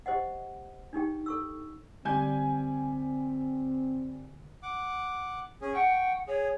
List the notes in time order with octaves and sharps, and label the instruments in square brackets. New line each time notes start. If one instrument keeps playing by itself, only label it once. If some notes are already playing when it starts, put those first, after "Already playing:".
[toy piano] G4 C5 D#5 F#5
D4 D#4 G4 G5
A4 C#6 E6
[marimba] D3 [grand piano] G3 G#5 G6 [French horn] C4
[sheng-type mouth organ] F#5 D6
C#4 G#4
[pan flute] F#5 [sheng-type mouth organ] G5 C#6
[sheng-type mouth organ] G#4 [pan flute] C#5